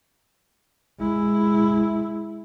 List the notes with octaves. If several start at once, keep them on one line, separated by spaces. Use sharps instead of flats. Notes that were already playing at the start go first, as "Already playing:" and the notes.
G#3 E4